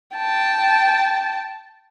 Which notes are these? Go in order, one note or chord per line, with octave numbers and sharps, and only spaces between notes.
G5 A5